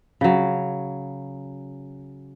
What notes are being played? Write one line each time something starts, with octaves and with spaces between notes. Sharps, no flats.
C#3 F#3